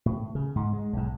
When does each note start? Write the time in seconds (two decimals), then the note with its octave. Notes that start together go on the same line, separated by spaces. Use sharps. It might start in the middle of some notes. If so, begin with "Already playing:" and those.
0.06 A2
0.35 C#3
0.56 G#2
0.73 G#3
0.93 B1 G#2